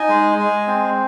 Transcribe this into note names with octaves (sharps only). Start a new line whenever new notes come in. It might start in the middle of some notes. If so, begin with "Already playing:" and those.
Already playing: D#4 G#5
G#3
G#3
C4